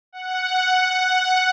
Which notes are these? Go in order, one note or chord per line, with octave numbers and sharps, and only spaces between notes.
F#5